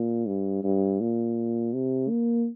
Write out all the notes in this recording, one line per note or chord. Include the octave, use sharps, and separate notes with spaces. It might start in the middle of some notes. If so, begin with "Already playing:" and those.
Already playing: A#2
G2
G2
A#2
C3
A#3